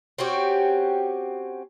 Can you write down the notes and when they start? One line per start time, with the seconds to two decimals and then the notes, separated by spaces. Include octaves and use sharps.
0.18 C4 C#4 F#4 G4